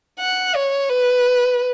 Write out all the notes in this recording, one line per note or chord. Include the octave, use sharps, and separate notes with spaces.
F#5
C#5
B4